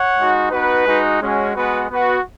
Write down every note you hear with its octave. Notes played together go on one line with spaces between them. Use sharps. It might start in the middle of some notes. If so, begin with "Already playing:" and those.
Already playing: C#5 F#5
G#3 D#4 F#4
B3 D#4 F#4 B4
G#3 D#4 F#4
G#3 C#4 F#4
G#3 B3 F#4 B4
B3 F#4 B4